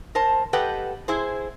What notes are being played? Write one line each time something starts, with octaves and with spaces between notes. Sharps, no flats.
A#4 C5 A5
G4 A4 B4 D#5 F#5 G5
E4 G#4 C5